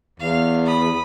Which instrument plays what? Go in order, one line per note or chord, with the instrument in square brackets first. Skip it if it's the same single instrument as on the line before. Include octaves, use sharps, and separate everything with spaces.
[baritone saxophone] E2 [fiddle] F5
[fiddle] B5 D#6